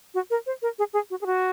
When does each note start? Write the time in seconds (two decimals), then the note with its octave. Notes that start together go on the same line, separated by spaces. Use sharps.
0.14 F#4
0.30 A#4
0.46 C5
0.62 A#4
0.79 G#4
0.93 G#4
1.10 F#4
1.21 G#4
1.26 F#4